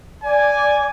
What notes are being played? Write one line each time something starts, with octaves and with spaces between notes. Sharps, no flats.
D5 G#5